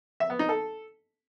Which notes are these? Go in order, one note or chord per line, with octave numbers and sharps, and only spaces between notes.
E5
B3
D#4
A4